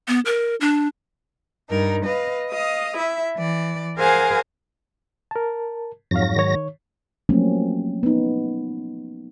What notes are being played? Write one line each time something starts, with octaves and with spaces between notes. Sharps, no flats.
B3
A#4
D4
G2 D#4 A#4
B4 D#5 F5
D#5 F5 D#6
E4 E5
E3 D5
G#4 A#4 C5 F5 F#5 G#5
A#4 A5
F2 G#2 F#3 F5 A#6
D#3 C#5
F3 F#3 A3 A#3 C4 C#4
B3 D#4